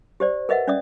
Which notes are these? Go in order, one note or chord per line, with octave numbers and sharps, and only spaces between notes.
G4 C5 D5
A#4 B4 D#5 E5 F#5
C#4 D5 E5 D#6